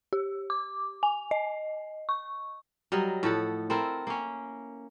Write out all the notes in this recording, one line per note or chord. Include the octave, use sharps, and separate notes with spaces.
G4
D6
G#5
D#5
C#6
F#3 G3 A#4 D#5
A2 F3 A4 F#5
C4 E4 A4 A#4
A#3 C#4